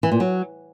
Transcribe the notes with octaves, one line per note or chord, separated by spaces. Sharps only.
E3
A#2
F#3